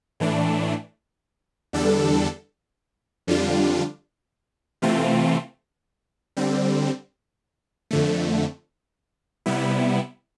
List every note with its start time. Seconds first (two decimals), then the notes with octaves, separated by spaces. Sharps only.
0.20 A2 E3 A3 D4
1.73 E2 D3 G3 D4 A4
3.27 F2 D3 G3 D4 F4
4.82 C3 E3 A3 C4 F4
6.37 D3 G3 C4
7.91 F2 D3 A3
9.46 C3 G3 B3 E4